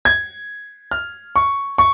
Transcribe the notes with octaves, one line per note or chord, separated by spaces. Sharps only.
G#6
F6
C#6
C#6